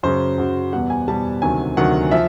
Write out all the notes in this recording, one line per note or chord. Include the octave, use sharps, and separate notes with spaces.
F#2 C#3 F#3 C5
F#2 C#3 F#3
E2 B2 G3 F#5
G#5
E2 B2 G3 A5
D2 C3 D#3 F#3 G#5
D2 C3 D#3 F#3 F#5
F3 E5